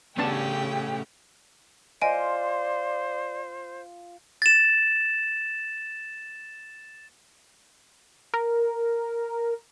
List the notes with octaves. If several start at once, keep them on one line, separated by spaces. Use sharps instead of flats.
C#3 A3 B3 C#4 D4 G4 G5 A5
F4 C5 D5 D#5 G#5 D7
A6 E7
A#4